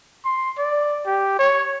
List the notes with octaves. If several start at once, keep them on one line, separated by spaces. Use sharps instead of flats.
C6
D5
G4
C#5